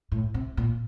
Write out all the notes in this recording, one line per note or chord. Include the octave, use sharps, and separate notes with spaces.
A2
C3
A#2